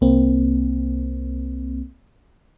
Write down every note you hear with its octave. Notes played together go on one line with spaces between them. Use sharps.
C2 A#3 C4